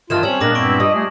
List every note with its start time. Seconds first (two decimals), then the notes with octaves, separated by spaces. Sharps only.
0.10 G2 D#3 E3 F4 A5 F6 E7
0.23 G3 C4 C#4 C#5 E6 G#6 F#7
0.41 A#2 G#3 B3 D4 A#4 D6 A#6 F#7
0.55 G2 B3 C4 E4 C#6 D7
0.80 G3 F4 D#5
0.94 A3 G#4